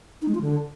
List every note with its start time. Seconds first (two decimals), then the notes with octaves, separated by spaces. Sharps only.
0.22 D#4
0.28 G#3
0.35 F4
0.41 D3